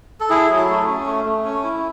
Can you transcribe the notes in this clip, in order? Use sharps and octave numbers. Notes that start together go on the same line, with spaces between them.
A4
E4 G#4
F#3
A4
A3
C#4
A3
A3
C#4
E4